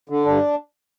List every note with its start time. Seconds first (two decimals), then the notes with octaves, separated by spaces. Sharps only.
0.09 D3
0.25 G2 D4